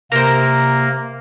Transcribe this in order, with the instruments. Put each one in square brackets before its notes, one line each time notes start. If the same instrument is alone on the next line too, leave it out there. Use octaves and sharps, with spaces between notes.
[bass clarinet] C3 [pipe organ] A#3 [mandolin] A#4 C5